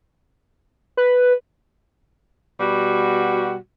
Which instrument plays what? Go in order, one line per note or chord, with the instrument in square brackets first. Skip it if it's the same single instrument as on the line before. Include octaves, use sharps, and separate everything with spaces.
[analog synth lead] B4
[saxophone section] B2 G3 F#4